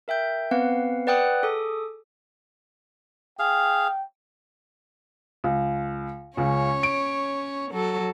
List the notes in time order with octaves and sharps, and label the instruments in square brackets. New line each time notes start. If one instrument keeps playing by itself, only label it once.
[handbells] A#4 E5 G5 G6
B3 C4 B4 F5 F#5
B4 D5 F#5 G5 D#6 F#6
G#4 A4 D6 D#6
[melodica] G#4 F5 [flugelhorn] G5
[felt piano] C#2
[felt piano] C#2 C#3 [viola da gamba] C#4 C#5
[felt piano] D7
[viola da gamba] F#3 A4